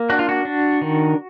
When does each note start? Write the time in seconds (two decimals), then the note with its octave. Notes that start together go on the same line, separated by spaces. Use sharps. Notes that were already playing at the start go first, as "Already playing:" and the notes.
Already playing: A#3
0.09 D4 F#4
0.19 F4
0.29 F#4
0.45 D4
0.81 D#3